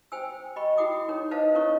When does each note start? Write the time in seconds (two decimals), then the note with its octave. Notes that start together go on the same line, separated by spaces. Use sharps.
0.12 C5 G5 G#5 E6
0.56 D#5 G5 B5 C#6
0.77 E4 F#4 F#5 G5 D6 D#6
1.08 D#4 A#4 C#5
1.31 B4 C5 D#5 F5 A5
1.55 C#4 E4 A#4 C#5 D#5 C#6